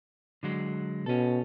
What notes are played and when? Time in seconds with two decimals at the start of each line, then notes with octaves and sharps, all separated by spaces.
0.43 D3 F#3 G#3
1.06 B2 C#4 A4